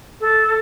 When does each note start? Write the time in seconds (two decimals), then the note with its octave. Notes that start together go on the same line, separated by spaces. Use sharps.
0.20 A4